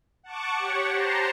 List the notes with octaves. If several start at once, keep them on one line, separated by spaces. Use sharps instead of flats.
F#5 A5 C#6 D6
G4 C#5 F#5 C#6
G4 C5 A5 A#5 C6